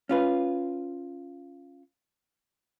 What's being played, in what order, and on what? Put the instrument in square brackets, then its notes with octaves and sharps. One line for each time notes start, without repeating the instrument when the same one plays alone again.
[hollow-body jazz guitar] C#4 F4 B4